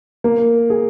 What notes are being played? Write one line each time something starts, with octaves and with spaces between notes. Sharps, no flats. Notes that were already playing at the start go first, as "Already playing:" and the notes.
A#3
G#4